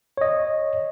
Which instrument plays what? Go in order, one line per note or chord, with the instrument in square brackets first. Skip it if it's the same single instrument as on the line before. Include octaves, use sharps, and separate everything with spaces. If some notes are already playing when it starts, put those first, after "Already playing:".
[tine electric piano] C#5 D#5